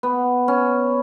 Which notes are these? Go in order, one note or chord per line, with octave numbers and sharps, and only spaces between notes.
B3
C#4